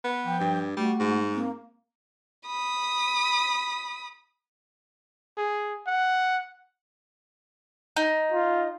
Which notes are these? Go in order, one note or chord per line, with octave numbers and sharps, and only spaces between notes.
B3
F3 G5
G2
G3 A3 F#4
G#2
A#3 C4
B5 D#6
G#4
F#5
D#4
F4